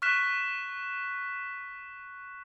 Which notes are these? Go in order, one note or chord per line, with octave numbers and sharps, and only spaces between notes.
C#6 F6 F#6 B6 E7